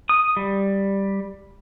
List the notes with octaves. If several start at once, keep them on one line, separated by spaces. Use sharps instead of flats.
D#6
G3